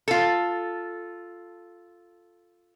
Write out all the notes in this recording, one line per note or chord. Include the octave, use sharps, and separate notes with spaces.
F4 A4